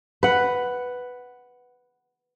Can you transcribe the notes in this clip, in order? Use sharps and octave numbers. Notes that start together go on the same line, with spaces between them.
B4 F#5